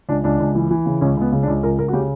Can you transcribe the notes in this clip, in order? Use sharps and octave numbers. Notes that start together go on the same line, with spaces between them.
C#2 D4
C#2 D4
C#2
E3
E3
C#3
C#2 C#4
C#2 B3
C#3
D4
C#2
C#2 A#4
C#2 A#4
F#4
C#3 G4